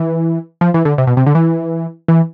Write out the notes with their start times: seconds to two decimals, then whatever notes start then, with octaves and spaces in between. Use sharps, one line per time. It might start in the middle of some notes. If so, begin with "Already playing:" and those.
Already playing: E3
0.61 F3
0.74 E3
0.85 D3
0.98 C3
1.07 B2
1.17 C3
1.26 D3
1.35 E3
2.08 E3